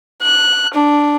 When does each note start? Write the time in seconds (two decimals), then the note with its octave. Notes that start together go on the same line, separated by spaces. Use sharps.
0.22 F#6
0.74 D4